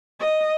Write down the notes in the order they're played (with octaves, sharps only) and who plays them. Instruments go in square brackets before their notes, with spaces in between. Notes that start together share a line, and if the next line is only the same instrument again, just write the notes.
[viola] D#5